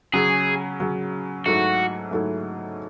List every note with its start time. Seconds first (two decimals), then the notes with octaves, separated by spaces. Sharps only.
0.14 C#3 F#3 C#4 G#4
0.80 C#3 F#3 C#4
1.46 G#2 F#3 A3 E4 F#4 A4
2.11 G#2 F#3 A3 E4 A4